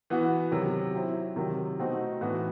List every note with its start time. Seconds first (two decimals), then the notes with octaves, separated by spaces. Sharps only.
0.10 E3 B3 F#4
0.51 C3 D#3 F#3
0.94 F#3 C4 E4
1.36 C3 D#3 F#3
1.79 B2 A3 C4 D#4 F#4
2.21 A2 E3 B3 F#4